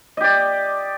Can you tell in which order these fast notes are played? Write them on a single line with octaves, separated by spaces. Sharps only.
D#5 G4 D5